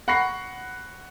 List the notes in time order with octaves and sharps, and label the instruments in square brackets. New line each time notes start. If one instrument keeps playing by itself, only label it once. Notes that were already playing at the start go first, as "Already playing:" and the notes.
[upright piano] F#5 B5 C#6 A#6 C7